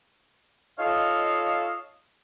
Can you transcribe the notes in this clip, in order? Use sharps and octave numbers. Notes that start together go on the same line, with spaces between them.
D#4 F4 A4 C#5 D#5 F5